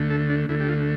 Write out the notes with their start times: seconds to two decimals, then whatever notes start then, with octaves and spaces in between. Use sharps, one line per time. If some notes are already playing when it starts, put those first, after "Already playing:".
Already playing: D2 D3 A3
0.10 A4
0.30 D4
0.49 D2 D3 A3 E4
0.60 G4
0.68 F4